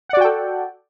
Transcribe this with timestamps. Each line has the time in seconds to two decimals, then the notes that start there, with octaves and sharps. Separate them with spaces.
0.09 F#5
0.13 D5
0.17 F#4
0.21 G5
0.24 A4